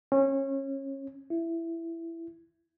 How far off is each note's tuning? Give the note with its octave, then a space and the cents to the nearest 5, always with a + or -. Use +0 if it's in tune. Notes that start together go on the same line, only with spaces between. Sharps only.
C#4 -25
E4 +10